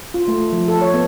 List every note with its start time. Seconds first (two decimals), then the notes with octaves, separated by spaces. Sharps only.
0.14 F4
0.28 A3
0.53 F3
0.68 A4
0.82 C#5
0.94 B3